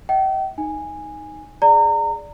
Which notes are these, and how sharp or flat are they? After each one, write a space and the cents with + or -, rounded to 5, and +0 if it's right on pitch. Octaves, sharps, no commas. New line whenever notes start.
E5 -40 G5 -40
D#4 +0 G#5 -10
G#4 +0 D5 +0 A#5 -30